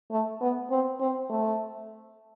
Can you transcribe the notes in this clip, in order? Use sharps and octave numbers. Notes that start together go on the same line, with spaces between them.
A3
B3
C4
C4
A3